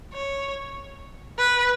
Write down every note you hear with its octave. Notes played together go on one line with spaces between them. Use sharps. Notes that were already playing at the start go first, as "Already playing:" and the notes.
C#5
B4